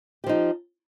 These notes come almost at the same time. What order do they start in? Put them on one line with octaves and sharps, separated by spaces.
G4 F3 D#4